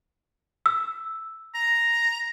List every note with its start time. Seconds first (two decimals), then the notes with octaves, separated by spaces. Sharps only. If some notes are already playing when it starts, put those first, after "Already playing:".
0.66 E6
1.55 A#5